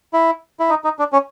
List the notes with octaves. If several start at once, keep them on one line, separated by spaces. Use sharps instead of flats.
E4
E4
D#4
D#4
D4
C#4